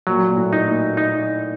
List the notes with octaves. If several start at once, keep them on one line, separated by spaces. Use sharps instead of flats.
A#2 F#3
A#2
A2
D#4
A#2
D#4